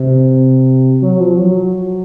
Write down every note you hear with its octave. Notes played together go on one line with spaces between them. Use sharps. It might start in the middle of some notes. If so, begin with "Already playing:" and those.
Already playing: C3
F#3
F3
F#3